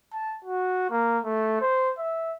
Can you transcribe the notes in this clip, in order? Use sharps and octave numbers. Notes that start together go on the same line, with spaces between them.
A5
F#4
A#3
A3
C5
E5